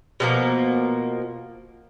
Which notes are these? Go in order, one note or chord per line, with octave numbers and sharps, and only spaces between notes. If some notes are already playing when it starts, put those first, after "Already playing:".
B2 F3 A#3